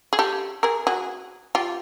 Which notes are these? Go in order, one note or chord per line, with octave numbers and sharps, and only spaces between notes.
G#4
G4 A4
G#4 A#4
F#4 G#4
F4 G4